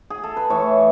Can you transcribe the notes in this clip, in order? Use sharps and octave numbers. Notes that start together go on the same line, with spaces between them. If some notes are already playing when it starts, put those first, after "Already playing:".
Already playing: F#4
G#4
A4
B4
A2 E3 C#5